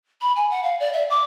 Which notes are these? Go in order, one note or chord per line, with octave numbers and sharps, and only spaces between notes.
B5
G#5
F#5
F5
D5
E5
D6